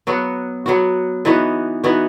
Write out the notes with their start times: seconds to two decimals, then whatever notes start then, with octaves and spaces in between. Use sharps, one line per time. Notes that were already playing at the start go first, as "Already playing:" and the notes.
0.07 F#3 B3 F#4
0.66 F#3 B3 F#4
1.25 E3 B3 D#4 F#4
1.84 E3 B3 D#4 F#4